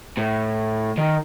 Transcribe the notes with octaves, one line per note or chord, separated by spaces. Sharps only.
A2
D#3